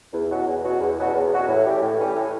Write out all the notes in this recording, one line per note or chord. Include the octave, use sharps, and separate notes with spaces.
E2
B2 F#3 C#4 F#4
E2
B2 F#3 C#4 F#4
E2
B2 F#3 C#4 F#4
E2
B2 F#3 C#4 F#4
A2
E3 G3 C#4 G4
A2
E3 G3 C#4 G4
A2